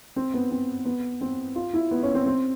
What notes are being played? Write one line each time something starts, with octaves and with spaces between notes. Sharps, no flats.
C4
B3
C4
B3
C4
F4
E4
B3
C#4
C4
C4